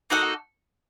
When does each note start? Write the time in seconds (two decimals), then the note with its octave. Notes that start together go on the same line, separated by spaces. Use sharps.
0.10 A#3 D#4 F#4 A4 F#5